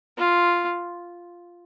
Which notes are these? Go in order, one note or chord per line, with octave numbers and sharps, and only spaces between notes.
F4